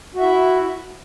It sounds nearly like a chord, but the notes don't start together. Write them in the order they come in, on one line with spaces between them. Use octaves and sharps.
F#4 E5 E4